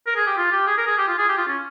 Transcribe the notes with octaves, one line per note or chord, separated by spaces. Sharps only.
A#4
G#4
G4
F4
G4
G#4
A#4
G#4
G4
F4
G#4
G4
F4
C#4